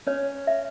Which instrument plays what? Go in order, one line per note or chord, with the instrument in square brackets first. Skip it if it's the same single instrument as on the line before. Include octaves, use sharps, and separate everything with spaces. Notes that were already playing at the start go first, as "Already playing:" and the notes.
[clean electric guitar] C#4 [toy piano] C#5
[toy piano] E5